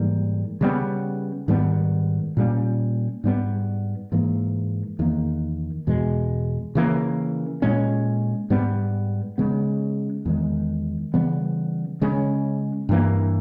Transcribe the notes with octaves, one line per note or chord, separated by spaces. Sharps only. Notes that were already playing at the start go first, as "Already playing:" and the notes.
Already playing: G#2 E3 G3 A#3
C#3 G3 B3
G#2 D#3 G3 B3
A#2 G3 C#4
G#2 G3 B3
G#2 E3 A#3
E2 D#3 A#3
E2 B2 G#3
C#3 E3 A#3
A#2 G#3 C#4
G#2 G3 B3
C#3 G#3 B3
E2 D#3 G#3
C#3 E3 G3 B3
C#3 G#3 C#4
G2 E3 A#3